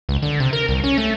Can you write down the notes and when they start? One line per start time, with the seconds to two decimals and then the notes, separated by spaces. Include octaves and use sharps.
0.09 C#2
0.22 D3
0.40 C3
0.53 A#4
0.68 C2
0.84 C#4
0.98 A3